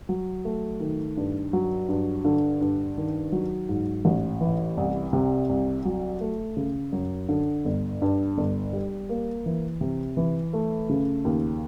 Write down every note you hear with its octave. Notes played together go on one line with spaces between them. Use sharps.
F#3
A3
D#3
G2
F#3
G2
D3
G2
D#3
F#3
G#2
A1
E3
C2
C3
C2
F#3
A3
C#3
F#2
D3
G1
G2
G1
G3
A#3
E3
C3
E3
A3
C#3
D#2